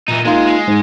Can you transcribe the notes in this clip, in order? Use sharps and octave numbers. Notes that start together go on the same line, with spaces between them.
A#2 E3 D#4
G#3 A#3 D#4 F4
G#3
G#2